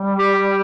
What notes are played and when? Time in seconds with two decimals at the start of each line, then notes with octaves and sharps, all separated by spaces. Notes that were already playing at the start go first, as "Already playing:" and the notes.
Already playing: G3
0.19 G4